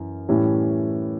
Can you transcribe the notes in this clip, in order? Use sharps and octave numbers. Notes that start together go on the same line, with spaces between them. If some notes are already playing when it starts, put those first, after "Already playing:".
Already playing: F#2 E3
A2 E3 G3 C#4